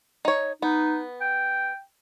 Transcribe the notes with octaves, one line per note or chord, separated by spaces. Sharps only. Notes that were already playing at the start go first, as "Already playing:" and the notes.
D#4 C#5
B3 D#4
G5